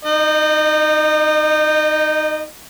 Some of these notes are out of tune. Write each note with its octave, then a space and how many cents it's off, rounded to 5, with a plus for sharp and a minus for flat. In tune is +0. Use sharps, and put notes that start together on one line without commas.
D#4 +0 D#5 -35